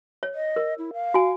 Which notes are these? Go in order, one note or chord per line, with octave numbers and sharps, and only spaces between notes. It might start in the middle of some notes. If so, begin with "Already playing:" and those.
C#5
D#5
A#4
E4
F5
F#4 G#5